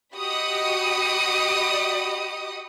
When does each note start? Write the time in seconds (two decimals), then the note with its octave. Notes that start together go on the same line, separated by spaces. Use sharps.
0.16 F#4 G4 D#5 B5 D#6 C#7